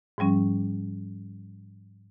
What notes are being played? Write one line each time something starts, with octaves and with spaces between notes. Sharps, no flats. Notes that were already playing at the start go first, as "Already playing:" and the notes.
G#2 F3 G3 C#4